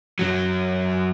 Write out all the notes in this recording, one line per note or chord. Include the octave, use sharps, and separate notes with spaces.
F#2 F#3